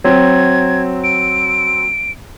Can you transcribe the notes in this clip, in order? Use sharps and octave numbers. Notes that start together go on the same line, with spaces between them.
F#3 C4 G#6
D7